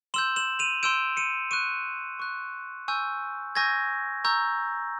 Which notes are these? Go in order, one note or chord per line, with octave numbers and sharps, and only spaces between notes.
C6 E6 G6 E7 F#7
E7 F#7
D#7 F7
C6 E6 G6 D7 E7
C#7 D#7
C#6 F#6 C#7 D#7
C#6 F#6
G#5 C#6 E6 G6
G#5 C#6 E6 G6 G#6 A#6
A#5 C#6 E6 G6